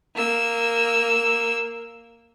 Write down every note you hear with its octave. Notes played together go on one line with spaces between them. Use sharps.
A#3 E6